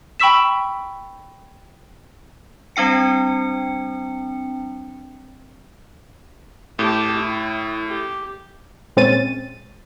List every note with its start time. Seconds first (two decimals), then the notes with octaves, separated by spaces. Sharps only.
0.20 G5 B5 C#6 E6 B6 E7
2.76 G3 C4 D4 G5 C#7
6.79 A2 G4 A5
7.17 E4
7.88 G4
8.97 A#2 G#3 C4 C#4 A6 D#7